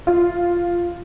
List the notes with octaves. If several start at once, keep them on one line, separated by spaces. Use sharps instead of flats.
F4